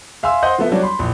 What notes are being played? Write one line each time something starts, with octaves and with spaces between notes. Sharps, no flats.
E5 F5 G#5 C6 E6
C5 D#5 F#5 C6 G6
F3 A3 B3 A4 E5
F#3 G3 D4 F#4
B5 C6
A#1 E3